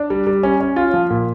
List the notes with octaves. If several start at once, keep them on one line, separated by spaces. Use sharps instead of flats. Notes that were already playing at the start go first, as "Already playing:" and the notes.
Already playing: D4
G3
G3
C#4
C#4
F4
F3
A#2